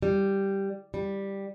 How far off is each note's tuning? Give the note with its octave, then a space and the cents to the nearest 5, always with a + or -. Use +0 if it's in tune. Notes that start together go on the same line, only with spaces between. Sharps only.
G3 +0
G3 +5